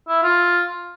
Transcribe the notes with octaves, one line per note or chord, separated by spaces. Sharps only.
E4
F4